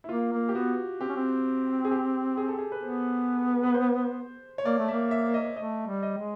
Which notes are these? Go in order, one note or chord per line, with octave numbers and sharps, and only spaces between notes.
E4
A#3 F4
A#3
G4
B3 F#4
C4 G4
C#4
C4
G#4
G4
G#4
A4
G#4
B4
B3 C5
B4
C5
C#5
A#3 D5
A3
A#3 E5
E5
D#5
A3 D#5
G3
D#5
G#3